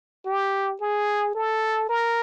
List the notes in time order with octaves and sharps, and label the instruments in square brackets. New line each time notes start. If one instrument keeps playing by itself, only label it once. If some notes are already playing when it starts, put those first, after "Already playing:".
[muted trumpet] G4
G#4
A4
A#4